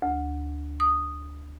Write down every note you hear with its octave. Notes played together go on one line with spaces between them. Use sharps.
D2
D#6